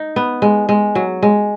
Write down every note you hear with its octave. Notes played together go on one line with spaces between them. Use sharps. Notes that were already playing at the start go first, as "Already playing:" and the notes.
Already playing: D#4
B3
G#3
G#3
F#3
G#3